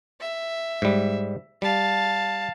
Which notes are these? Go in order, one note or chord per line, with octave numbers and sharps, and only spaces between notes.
E5
G#2 G3
G3 F5 A5